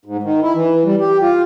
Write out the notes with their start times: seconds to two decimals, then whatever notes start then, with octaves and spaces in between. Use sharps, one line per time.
0.05 G#2
0.23 D#3
0.43 E4
0.55 E3
0.85 G3
1.00 G4
1.21 F4